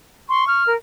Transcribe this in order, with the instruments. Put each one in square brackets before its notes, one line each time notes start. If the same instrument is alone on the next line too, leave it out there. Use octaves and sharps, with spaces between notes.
[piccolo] C6 [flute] C#6
[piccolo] F6
[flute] A#4